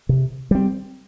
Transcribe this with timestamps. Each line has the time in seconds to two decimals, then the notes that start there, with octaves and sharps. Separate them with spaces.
0.09 C3
0.51 G3 C4